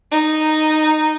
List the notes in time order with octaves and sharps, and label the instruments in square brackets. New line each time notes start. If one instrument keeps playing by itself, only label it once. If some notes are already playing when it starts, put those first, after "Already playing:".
[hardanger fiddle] D#4